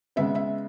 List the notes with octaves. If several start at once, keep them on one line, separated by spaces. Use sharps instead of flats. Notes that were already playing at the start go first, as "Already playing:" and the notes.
C#3 G#3 B3 E5
E5